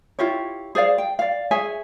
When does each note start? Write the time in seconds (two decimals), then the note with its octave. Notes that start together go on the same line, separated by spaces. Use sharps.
0.19 E4 F4 G4 C#5
0.75 G#4 C5 D5 F5
0.98 G5
1.19 D5 F5
1.51 G#4 C#5 E5 G#5